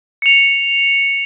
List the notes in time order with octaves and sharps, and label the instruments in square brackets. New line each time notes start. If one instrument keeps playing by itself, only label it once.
[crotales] C#7 F7